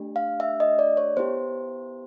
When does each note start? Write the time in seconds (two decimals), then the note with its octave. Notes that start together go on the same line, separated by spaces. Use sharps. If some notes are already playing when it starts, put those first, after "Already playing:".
Already playing: A3 D4 G4
0.16 F5
0.40 E5
0.60 D#5
0.79 D5
0.97 C#5
1.17 B3 E4 G4 C5